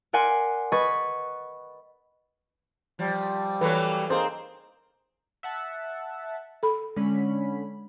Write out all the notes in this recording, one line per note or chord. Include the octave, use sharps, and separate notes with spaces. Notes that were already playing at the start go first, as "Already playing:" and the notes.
A#4 D5 F#5 G#5 C6
B4 D#5 B5 C#6 G#6 A6
F3 G3
E3 F#3 A#3 A4 B4 C#5
A#3 C4 D#4 G#4 A#4 C5
E5 F#5 A5
A4 B5
D3 G#3 C#4 B5